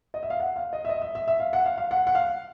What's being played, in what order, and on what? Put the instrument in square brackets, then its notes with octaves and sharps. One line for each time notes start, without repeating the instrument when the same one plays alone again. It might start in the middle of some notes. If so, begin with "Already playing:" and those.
[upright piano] D#5
E5
F5
F#5
F5
D#5
E5
D#5
E5
E5
E5
F5
F#5
F5
F5
F#5
F#5
F5